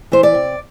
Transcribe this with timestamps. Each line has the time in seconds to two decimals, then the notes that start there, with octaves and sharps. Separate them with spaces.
0.12 E3 C5
0.23 D5
0.35 C3